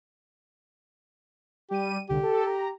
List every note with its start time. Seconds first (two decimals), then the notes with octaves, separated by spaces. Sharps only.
1.71 G3 G4 D#7
2.09 C2 D3 G4
2.23 A4
2.46 A#5